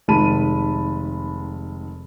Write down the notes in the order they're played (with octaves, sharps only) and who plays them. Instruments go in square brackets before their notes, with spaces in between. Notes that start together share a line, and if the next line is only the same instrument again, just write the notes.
[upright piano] F1 D#3 G#3 A5 B5 D#7